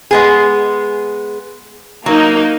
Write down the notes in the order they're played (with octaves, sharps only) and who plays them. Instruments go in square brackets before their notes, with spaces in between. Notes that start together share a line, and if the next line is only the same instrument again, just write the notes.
[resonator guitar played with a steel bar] G#3 B3 G#4
[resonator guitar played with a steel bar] F#3 [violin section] A#3 D#4